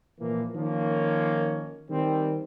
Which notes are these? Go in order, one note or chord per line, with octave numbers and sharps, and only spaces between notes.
A#2 E3 F3 A#3
D#3 F3 A#3 C#4
D#3 G3 C4